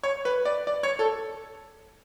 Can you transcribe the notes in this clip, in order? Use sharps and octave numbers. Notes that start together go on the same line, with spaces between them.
C#5
B4
D5
D5
C#5
A4